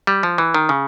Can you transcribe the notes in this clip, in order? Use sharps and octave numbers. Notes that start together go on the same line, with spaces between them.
G3
F3
E3
D#3
C#3